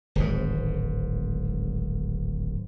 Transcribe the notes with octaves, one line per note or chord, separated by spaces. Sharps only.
D1 G#1 G#2